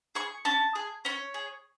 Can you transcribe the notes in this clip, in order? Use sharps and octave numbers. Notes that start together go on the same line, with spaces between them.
G#4 C#6
C#4 A5
G#4
C#4 C#5
G#4